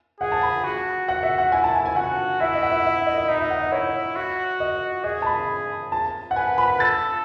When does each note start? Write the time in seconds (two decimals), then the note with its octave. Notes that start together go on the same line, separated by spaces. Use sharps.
0.20 G#4 F#5
0.32 A5
0.43 B5
0.65 F#4
1.08 F#5
1.23 E5
1.38 F#5
1.52 E4 G#5
1.64 A5
1.75 G#5
1.86 G#5
1.96 F#4 F#5
2.40 E4 E5
2.55 D#5
2.63 F#5
2.70 E5
2.84 E5
3.06 D#5
3.18 D#5
3.28 D#4 D#5
3.39 E5
3.50 F#5
3.62 D#5
3.72 E4 C#5
4.16 F#4
4.60 D#5
5.04 G#4 D#5
5.22 A5
5.26 B5
5.92 A5
6.31 F#5
6.36 B4 G#5
6.58 B5
6.79 A4 A6